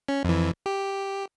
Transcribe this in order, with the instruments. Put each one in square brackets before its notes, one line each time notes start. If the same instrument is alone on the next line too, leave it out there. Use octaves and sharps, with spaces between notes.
[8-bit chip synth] C#4
F2 E3
G4